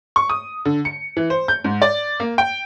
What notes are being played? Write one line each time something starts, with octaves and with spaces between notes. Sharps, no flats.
C#6
D#6
D3
C#7
E3
C5
G6
G#2
D5
A#3
G5